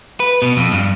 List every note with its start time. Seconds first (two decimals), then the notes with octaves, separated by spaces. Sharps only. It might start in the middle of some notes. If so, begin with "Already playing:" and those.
0.20 B4
0.42 B2
0.57 F2
0.72 G2